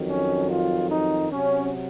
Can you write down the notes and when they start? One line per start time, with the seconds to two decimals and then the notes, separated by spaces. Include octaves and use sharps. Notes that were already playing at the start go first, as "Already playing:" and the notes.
Already playing: F2 D#3 F#3
0.09 C#4
0.50 F4
0.90 D#4
1.30 C3 F#3 C#4